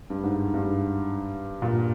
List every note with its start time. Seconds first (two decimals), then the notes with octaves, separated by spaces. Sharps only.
0.10 G2
0.23 G#2
0.54 G2
1.62 A#2